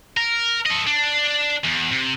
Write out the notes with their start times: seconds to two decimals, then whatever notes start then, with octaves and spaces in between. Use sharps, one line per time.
0.17 A#4
0.66 A4 D#5
0.87 D4
1.64 E2
1.91 C3